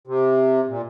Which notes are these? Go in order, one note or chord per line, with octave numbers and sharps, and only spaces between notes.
C3
A#2